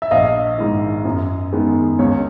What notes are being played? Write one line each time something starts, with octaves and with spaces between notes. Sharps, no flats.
E5
A#1 D#5 F5
G#2 D#3
F#2
D#3 G#3 B3
C#2 C#5